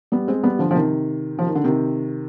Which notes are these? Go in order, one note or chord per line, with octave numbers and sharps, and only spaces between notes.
G3 B3
G#3 C4
G3 B3
D3 F3
F3
C3 D#3
F3
D#3
D3
C3 D#3